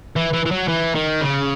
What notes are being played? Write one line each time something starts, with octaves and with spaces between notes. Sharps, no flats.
E3
E3
E3
F#3
E3
D#3
C#3